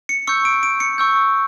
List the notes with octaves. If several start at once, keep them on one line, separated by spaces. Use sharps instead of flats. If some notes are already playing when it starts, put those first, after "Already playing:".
C#7
C#6 E6 G6 C#7
D7
D7
C#7
C#6 E6 G6